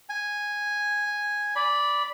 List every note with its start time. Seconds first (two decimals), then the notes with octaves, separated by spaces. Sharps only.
0.09 G#5
1.56 D5 B5